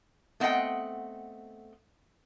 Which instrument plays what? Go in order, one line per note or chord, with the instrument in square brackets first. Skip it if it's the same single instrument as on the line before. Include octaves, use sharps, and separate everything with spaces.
[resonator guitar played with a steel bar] A3 B3 C4 D#5 F#5 G5